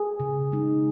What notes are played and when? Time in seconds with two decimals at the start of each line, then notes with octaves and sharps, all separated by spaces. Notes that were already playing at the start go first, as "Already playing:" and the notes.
Already playing: G#4
0.20 C#3
0.52 G#3 D#4